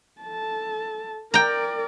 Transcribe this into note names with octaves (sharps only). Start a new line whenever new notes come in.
A4 A5
A#4 D5 G5 A#5